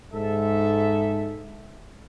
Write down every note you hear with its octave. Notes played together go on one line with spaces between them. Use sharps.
G#2 A4 E5